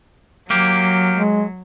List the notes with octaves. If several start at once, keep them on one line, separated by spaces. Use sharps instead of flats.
F#3 A#3 G4
G#3